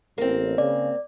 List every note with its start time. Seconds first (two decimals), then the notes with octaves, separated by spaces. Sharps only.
0.18 A1 A#3 C4
0.58 C#3 D5